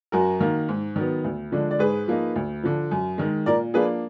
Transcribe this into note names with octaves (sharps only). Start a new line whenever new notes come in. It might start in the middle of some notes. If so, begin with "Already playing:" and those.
F#2 F#4 A#4
D#3 A#3
G#2
D#3 F#3 B3
D2
D3 F3 G#3 D4
D5
G#2 G#4 B4
F3 A#3 D#4
D2
D3 F3
F#2
D#3 G#3
A#2 A#4 D5
F3 A#3 D4 G#4 B4